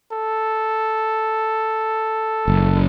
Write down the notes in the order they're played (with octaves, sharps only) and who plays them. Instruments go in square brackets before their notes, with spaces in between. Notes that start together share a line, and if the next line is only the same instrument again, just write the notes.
[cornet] A4
[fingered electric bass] F#1